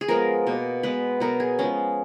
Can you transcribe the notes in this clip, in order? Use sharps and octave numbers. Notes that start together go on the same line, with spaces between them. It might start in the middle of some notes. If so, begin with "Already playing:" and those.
G#4
F3 G#3 B3 A#4
B2 A#3
B2 G#3 B3 B4
B2 F#3 B3 A#4
G#4
F3 G#3 B3 C#4